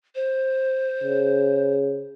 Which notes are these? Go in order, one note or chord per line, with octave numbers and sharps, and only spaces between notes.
C5
C#3